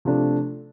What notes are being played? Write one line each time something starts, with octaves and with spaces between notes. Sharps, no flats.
C3 F3 A3 D4